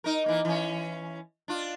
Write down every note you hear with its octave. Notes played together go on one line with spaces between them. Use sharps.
D#4 A#4
E3 A#3
E3 C#4
D4 F4